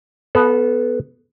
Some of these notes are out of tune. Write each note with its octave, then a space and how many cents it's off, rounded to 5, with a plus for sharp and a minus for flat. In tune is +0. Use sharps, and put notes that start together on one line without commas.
B3 +0 A4 -25 F5 +45